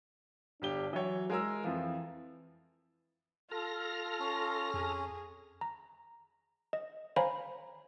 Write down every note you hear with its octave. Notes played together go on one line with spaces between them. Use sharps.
G1 D4 G4 G7
E3 F#3 C#5
G#3 A#4 E6
F2 E3 F3
F4 A4 F6 A#6
C#4
F2 G#4
A#5
D#5
C5 C#5 F5 G#5 A#5 B5